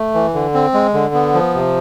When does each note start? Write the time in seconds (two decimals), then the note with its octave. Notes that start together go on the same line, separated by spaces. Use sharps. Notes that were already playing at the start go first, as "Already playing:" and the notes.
Already playing: A3
0.14 E3
0.34 D3
0.54 C4
0.74 G#3
0.94 D3
1.14 B3
1.34 F3
1.54 C3